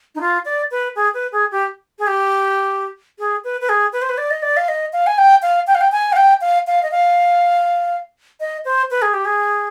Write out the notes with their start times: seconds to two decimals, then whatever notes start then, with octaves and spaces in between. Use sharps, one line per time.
0.15 D#4
0.21 F4
0.45 D5
0.71 B4
0.96 G#4
1.14 B4
1.32 G#4
1.52 G4
1.99 G#4
2.07 G4
3.19 G#4
3.44 B4
3.61 B4
3.69 G#4
3.93 B4
4.02 C5
4.09 B4
4.18 D5
4.31 D#5
4.42 D5
4.57 F5
4.69 D#5
4.93 F5
5.07 G#5
5.18 G5
5.43 F5
5.67 G5
5.75 F5
5.81 G5
5.92 G#5
6.13 F5
6.16 G5
6.41 F5
6.67 F5
6.83 D#5
6.92 F5
8.40 D#5
8.65 C5
8.91 B4
9.02 G#4
9.13 G4
9.25 G#4